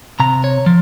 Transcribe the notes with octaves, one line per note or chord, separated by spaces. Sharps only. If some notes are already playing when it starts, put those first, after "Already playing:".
C3 A#5
C#5
F3